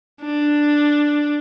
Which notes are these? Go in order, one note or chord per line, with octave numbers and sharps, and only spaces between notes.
D4